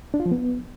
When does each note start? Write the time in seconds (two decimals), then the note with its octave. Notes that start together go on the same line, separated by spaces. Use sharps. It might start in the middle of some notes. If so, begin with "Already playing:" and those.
0.14 D4
0.20 F4
0.26 F3
0.31 B3